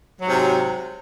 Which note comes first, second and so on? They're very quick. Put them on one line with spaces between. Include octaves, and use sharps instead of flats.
F#3 G#2 C3